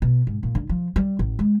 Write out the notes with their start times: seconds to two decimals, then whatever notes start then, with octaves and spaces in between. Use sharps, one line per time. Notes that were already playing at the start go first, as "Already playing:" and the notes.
0.02 B2
0.27 G#2
0.43 A#2
0.55 D3
0.69 F3
0.96 G3
1.19 A1
1.39 G#3